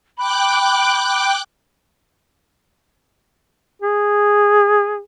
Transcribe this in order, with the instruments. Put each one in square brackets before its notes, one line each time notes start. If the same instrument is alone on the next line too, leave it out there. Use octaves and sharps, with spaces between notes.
[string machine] G5 D6 F#6 [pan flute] B5
[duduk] G#4